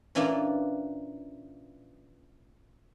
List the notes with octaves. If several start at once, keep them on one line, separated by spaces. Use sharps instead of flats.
A#2 E3 C#4 D4 F4 A#4